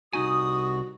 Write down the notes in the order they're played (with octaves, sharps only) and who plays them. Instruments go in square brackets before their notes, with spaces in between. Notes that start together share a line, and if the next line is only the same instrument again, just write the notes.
[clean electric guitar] C2 D#4 G#5 [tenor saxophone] F#4 [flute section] D#6